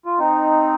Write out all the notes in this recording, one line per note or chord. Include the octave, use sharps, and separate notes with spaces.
F4
C4 D#4